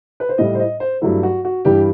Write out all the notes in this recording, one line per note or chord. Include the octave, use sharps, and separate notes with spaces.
B4
C5
A2 G3 D#5
C5
D#5
C5
G2 F#3 A3 E4
F#4
F#4
G2 E3 G3 G4